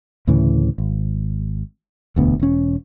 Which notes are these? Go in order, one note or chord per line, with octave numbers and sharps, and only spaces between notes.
D2 A2 C#3 E3
G#1
E1 D2 B3
E1 C#4